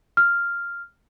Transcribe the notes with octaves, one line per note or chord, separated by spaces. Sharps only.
F6